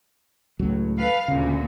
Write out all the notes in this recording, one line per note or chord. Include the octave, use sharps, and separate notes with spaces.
C#2 A2 F#3
A4 B4 F5
D2 A#2 C#3